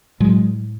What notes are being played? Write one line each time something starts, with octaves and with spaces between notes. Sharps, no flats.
A2 F#3 G#3